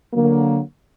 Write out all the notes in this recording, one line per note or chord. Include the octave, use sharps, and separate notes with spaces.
D3 F#3 A#3